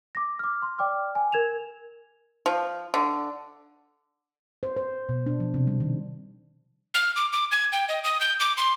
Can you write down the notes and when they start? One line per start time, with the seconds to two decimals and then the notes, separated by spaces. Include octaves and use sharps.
0.15 D6 A#6
0.39 D6 F6
0.62 C6
0.79 D5 G5 D6 F6
1.15 G#5
1.32 A#4 G#6 E7 F7
2.46 F3
2.94 D3
4.63 C5
4.76 C5
5.09 B2
5.26 D4
5.40 F3
5.54 C3
5.67 G3
5.80 D#3
6.94 F6
7.16 D6
7.33 D6
7.51 G#6
7.73 G5
7.89 D#5
8.04 D#6
8.21 G6
8.40 D6
8.57 C6